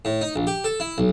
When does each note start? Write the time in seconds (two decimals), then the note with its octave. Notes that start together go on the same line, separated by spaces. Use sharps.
0.05 A2
0.21 D#4
0.36 A#1
0.47 G4
0.64 A4
0.80 E4
0.98 B1